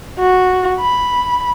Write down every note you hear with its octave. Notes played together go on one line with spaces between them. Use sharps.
F#4
B5